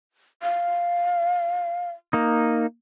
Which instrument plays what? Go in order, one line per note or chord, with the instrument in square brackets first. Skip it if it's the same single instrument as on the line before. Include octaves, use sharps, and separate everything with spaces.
[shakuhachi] F5
[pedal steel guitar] A#3 D#4